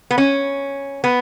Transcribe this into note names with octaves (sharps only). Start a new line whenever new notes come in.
B3
C#4
B3